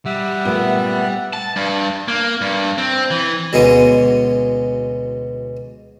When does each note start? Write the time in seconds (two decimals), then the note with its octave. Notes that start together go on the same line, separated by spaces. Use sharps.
0.06 G3 E5 F#5
0.45 A#2 A3 B3
1.33 A5
1.56 G2
2.08 A#3
2.41 G2
2.78 C4
3.11 E3
3.53 D2 B2 G#3 B3 C#4